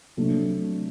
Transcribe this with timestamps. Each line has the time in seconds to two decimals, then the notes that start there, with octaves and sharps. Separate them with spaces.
0.17 C3 F#3 A3 D4